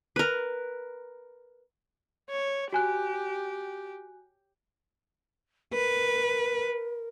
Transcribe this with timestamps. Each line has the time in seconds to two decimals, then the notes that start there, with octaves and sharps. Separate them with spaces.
0.16 A#4 B4
2.30 C#5
2.73 F#4 G4 G#5 F#6
5.73 A#4 B4